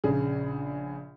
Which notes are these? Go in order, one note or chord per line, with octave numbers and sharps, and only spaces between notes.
A#1 C#3 G#4